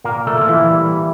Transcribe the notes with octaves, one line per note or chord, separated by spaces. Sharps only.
A#2 A#3 A#4
A3 A4
A#3 F4
E3 E4
G3